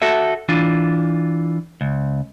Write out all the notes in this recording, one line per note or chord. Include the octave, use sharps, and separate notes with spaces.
F#4 A4 E5
E3 D4 F4
C#2